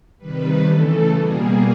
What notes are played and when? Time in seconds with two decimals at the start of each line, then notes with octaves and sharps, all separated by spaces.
0.18 C3 D#3 G3 B4
0.63 C#3 E3 A3 A4
1.09 B2 G3 A#3 G#4